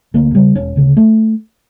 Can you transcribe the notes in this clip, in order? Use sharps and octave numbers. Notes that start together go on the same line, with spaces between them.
D2 A#3
C#3 G3
E1 C#4
D2 C#3
A3